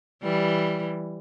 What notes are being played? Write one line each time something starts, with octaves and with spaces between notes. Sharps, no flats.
E3 G3